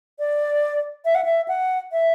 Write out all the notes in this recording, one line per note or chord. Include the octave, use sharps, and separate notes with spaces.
D5
E5
F#5
E5
F#5
E5